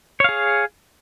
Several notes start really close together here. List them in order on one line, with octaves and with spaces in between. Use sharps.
C#5 F5 G#4